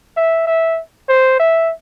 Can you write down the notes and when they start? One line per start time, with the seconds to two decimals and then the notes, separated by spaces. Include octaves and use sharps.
0.17 E5
0.47 E5
1.08 C5
1.39 E5